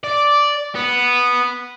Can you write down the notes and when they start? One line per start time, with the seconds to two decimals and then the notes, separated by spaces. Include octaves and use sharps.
0.04 D5
0.75 B3